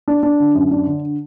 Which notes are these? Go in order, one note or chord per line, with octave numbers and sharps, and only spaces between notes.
D4
D4
D3
F#2
D4
D3